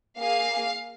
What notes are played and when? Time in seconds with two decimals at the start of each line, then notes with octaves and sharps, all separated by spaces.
0.19 A#3 G#4 F5